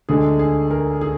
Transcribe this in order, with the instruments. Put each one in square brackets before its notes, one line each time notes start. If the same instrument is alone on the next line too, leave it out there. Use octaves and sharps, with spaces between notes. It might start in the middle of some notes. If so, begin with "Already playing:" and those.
[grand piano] D2 D3 G#3 G#4
G#4
A#4
G#4